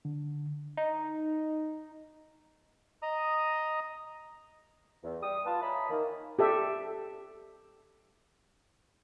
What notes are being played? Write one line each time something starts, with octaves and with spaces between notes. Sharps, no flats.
D3
D#4
D#5 A#5 D#6
E2
G3 D#6
F4 B4 A5
C#5 D#5 E5 G#5 A#5 B5
D#3 A#3
G4 A4 E5